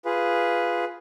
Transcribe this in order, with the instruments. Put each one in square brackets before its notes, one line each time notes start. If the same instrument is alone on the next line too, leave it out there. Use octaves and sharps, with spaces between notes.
[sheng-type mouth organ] F4 G#4 B4